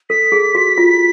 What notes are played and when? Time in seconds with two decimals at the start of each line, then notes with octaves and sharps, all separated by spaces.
0.10 A4 B6
0.32 G#4
0.55 F#4
0.78 F4